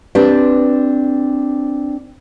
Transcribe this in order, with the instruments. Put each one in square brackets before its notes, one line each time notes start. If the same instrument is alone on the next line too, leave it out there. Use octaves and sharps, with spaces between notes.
[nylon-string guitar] C4 D4 G4 B4 D5